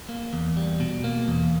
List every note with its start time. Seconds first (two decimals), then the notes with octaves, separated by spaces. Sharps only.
0.09 A#3
0.33 E2
0.57 G3
0.80 B2
1.04 A#3
1.28 E2